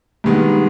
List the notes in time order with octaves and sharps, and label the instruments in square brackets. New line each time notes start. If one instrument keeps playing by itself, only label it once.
[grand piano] G2 D#3 G#3 B3